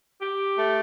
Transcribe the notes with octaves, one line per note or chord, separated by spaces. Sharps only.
G4
A3